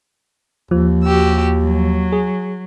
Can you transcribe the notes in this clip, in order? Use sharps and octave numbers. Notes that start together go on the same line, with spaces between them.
D#2 F3
F#4 G4 E6
F#3
G#4